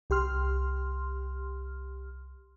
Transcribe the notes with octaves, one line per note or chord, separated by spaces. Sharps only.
C2 G4 C6 F6